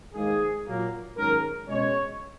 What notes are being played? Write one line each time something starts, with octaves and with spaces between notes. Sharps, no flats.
G#2 D#3 A#3 G#4
A#2 F#3 A#3
G#2 D#3 F#3 C#4 A#4
B2 G#3 C#4 C#5